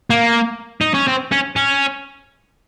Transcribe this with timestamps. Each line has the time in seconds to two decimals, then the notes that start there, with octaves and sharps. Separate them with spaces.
0.10 A#3
0.81 D#4
0.94 C#4
1.08 C4
1.32 C#4
1.56 C#4